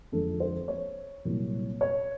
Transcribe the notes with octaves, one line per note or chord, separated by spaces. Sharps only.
F2 D3 F3 G#3 A4
C5
C#5
C2 A#2 F#3
C#5